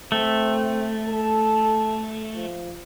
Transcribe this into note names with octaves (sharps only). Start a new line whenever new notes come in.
A3 C4
A4
F3